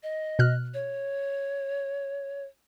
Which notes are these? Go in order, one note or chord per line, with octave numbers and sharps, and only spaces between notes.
D#5
B2 F6 F#6
C#5